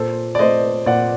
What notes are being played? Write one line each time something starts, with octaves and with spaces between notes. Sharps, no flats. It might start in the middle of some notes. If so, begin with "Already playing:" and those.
Already playing: A#2 A4 C5
D5
A3 C5 D#5
A#2 D5 F#5